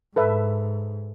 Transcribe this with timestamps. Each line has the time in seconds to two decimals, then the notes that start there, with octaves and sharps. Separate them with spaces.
0.16 G#2 A4 B4 E5